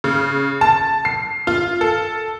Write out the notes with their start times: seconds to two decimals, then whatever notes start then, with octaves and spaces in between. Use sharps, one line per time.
0.04 C#3
0.61 A5
1.05 C7
1.47 F4
1.81 A4